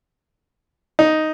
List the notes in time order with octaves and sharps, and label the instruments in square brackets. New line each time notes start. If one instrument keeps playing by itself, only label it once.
[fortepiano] D#4